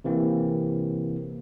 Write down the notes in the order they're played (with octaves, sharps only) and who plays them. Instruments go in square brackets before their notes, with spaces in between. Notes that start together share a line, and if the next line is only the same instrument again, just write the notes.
[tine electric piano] C3 E3 A#3 C4